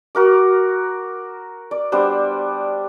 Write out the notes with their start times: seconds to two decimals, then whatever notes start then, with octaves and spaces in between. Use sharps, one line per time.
0.15 F#4 A#4 D6
1.71 D5
1.92 G3 B3 D4 C5